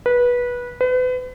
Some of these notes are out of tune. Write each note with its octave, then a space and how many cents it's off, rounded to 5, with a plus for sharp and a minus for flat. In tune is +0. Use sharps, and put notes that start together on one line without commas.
B4 -20
B4 +35